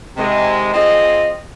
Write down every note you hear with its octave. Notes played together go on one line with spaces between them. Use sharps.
C3 D#3 G#3
C4 F4 G#4 D#5